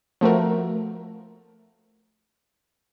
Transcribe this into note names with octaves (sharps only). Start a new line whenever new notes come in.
F3 A3 F#4 A#4